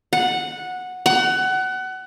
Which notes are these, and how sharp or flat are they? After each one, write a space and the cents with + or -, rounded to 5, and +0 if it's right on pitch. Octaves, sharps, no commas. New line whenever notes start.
F#5 -10
F#5 +25